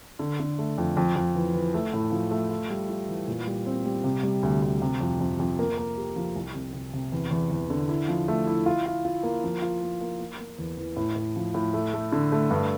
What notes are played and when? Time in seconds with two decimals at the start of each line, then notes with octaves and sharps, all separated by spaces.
0.19 D3
0.40 D3
0.58 A3
0.78 F2
0.97 F2
1.16 F2
1.35 E3
1.54 E3
1.74 A3
1.93 A2
2.12 F3
2.31 A3
2.50 F4
2.70 G3
2.89 F4
3.08 E3
3.28 A#2
3.47 G3
3.66 C4
3.86 G3
4.04 C3
4.23 G3
4.43 D2
4.62 D2
4.82 C3
5.01 F2
5.20 F2
5.40 F2
5.59 A#3
5.78 A#3
5.97 G4
6.16 F3
6.36 C2
6.54 C3
6.73 C3
6.94 C3
7.12 E2
7.31 E2
7.51 E2
7.70 D3
7.89 E4
8.08 F3
8.28 A3
8.47 E4
8.66 F4
8.86 F4
9.05 F4
9.23 A#3
9.44 F3
9.62 F4
9.82 A#3
10.01 A#3
10.19 A#3
10.40 A#3
10.58 E2
10.77 E3
10.97 A2
11.16 A2
11.36 F3
11.54 A2
11.74 A3
11.94 A3
12.12 D3
12.32 A3
12.51 G2